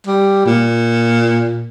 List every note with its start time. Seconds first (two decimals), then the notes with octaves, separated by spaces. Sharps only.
0.07 G3
0.46 A#2